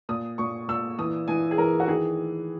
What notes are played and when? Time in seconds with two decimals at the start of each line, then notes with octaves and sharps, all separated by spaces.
0.09 A#2 D#6
0.38 A#2 C#6
0.68 A#2 E6
0.99 E3 D#6
1.28 E3 G#5
1.51 G#4
1.58 E3 A#4
1.80 F#4
1.88 D#3 G#4